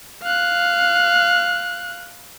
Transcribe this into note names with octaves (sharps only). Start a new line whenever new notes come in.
F5 F#6